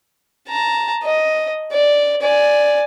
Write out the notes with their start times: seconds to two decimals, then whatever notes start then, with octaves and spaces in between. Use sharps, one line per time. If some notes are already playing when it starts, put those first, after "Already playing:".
0.49 A5 A#5
1.04 D#5
1.73 D5
2.22 D5 G#5